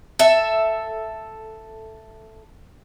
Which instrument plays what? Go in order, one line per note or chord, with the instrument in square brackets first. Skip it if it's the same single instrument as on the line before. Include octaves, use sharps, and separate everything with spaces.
[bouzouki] A4 E5